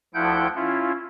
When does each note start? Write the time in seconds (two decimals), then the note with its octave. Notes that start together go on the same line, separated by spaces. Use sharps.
0.14 D2 F3 E4 F#5 G5 G6
0.55 C#4 E4 F4